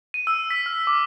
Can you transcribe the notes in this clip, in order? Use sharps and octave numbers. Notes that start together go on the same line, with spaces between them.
D#7
E6
B6
F6
D6